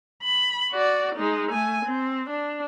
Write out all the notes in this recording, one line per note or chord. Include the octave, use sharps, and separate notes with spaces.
B5
F#4 D5
G#3 D#4
A3 G#5
C4
D4